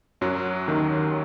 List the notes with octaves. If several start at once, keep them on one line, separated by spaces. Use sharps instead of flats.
F#2 F#3
D#2 D#3